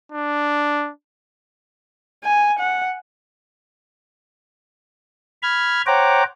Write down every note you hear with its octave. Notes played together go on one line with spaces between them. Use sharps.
D4
G#5
F#5
B5 F6 G#6
C5 C#5 F#5 G5 A#5 D6